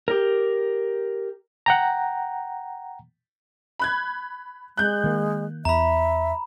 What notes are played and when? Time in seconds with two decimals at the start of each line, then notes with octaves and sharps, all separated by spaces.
0.08 G4 A#4
1.66 F#5 G5 A#5
3.79 B5 F#6 G#6
4.77 G#3 F#6 G6
5.04 D#3 A#3
5.65 E2 E5 A#5 B5